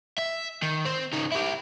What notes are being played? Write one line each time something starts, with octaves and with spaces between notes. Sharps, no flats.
E5
D#3
C4
C#3 D#4
E4 G4